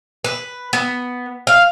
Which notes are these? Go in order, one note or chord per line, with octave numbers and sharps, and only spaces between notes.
B4
B3
F5